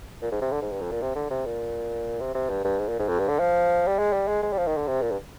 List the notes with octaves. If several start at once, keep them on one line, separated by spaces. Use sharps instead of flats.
A#2
G#2
C3
D3
G#2
G2
F2
A#2
C3
D3
C3
A#2
C3
C3
G2
G2
G#2
A#2
G#2
F2
G2
D3
F3
G3
G#3
G3
G#3
G#3
G3
F3
D#3
D3
C3
A#2
G2